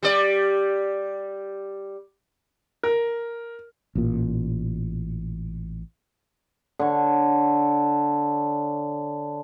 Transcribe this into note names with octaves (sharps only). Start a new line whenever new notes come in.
G3 D5
A#4
A1 A#2
D3 C#5